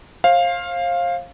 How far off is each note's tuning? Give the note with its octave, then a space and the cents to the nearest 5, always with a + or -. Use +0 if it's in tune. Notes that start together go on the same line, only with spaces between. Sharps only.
C5 +40 F5 +0